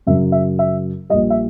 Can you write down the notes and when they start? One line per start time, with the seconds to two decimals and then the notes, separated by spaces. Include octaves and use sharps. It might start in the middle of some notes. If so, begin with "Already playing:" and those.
0.07 F#2 C#3 F#3 E5
0.32 E5
0.59 E5
1.10 A#1 A#2 G3 D#5
1.30 E5